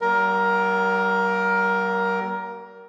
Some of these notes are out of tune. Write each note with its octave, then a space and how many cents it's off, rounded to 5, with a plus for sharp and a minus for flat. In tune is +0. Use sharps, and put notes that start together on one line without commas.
G3 -45 A#3 +15 A#4 +15